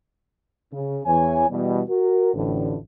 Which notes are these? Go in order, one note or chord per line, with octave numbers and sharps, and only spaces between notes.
C#3
E2 E3 C#5 G#5
E2 B2 E3 G3
F#4 A#4
A1 F2 A2 D3